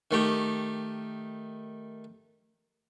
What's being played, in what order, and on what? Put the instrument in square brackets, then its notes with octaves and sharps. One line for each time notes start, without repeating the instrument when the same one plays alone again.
[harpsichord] D#3 A3 G4